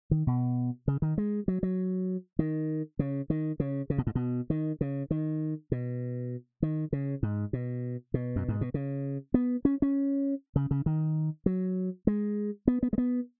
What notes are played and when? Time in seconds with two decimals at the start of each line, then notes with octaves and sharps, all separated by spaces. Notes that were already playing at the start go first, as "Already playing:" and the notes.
0.11 D#3
0.27 B2
0.88 C#3
1.02 D#3
1.18 G#3
1.48 F#3
1.63 F#3
2.39 D#3
2.99 C#3
3.30 D#3
3.60 C#3
3.90 C#3
3.98 B2
4.07 G#2
4.15 B2
4.50 D#3
4.81 C#3
5.11 D#3
5.72 B2
6.62 D#3
6.93 C#3
7.23 G#2
7.53 B2
8.14 B2
8.36 F#2
8.48 G#2
8.61 B2
8.74 C#3
9.34 B3
9.65 C#4
9.82 C#4
10.56 C#3
10.71 C#3
10.86 D#3
11.46 F#3
12.07 G#3
12.67 B3
12.83 B3
12.93 G#3
12.98 B3